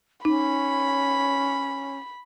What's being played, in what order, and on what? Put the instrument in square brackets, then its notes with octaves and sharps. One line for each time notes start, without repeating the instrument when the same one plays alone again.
[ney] C#4 [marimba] D#4 [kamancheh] B5